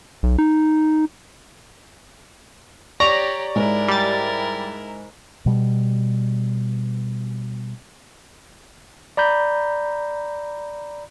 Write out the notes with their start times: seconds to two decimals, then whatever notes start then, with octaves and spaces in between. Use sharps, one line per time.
0.23 B1
0.38 D#4
3.00 G4 C#5 D5 A#5 C#6
3.56 G#2 E4 A#4
3.88 G3 A6
5.46 B2 G3
9.17 D5 A#5 B5 G6